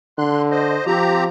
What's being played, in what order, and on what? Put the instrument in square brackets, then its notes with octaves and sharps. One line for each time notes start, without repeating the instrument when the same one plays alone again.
[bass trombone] D3 [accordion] C6 F#6
[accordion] C5 D#5
[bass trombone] F3 [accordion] C4 G4 A#5